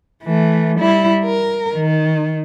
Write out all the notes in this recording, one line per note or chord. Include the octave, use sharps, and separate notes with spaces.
E3 A3
G3 E4
A#4
D#3